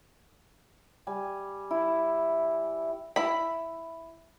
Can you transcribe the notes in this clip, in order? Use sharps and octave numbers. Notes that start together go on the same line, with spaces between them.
G3 G#5
E4
E4 B5